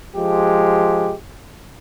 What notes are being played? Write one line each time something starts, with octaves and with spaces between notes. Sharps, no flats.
F3 G#3 G4